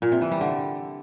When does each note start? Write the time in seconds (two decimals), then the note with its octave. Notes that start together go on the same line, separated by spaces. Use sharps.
0.02 A#2
0.12 C3
0.21 E3
0.31 G3
0.41 D3